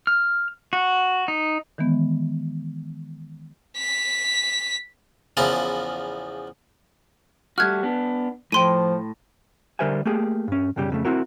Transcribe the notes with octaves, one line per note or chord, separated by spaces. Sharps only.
F6
F#4
D#4
D#3 E3 G#3 B3
B6
E2 C#3 F3 E4 A#4 A5
G3 A3 F#4 F6 F#6 G#6
B3 D4
A2 F3 G5 C6 D#7
D3 G3 A#4 C5 E5 G#5
A3 A#3 G4 G#4
G2 C#4
B1 F#2 C#3 G3 G4
F2 C#3 A3
C4 E4 F#4 A#4